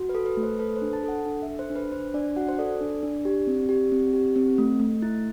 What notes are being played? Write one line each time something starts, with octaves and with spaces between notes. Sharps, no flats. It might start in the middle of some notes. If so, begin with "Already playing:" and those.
Already playing: F#4
B4
A4
B4
A3
C5
A4 B4
C5
D4
A5
A4 F#5
D4
A4 E5
C5
D4
B4
D4 C5
D4 D5
F#4 F#5
C5
A4 D5
D4
D4
G4
C4
G4
C4
G4
C4
A3
A3
E4